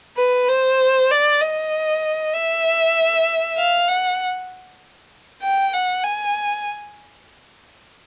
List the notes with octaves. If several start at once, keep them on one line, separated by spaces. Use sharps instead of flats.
B4
C5
D5
D#5
E5
F5
F#5
G5
F#5
G#5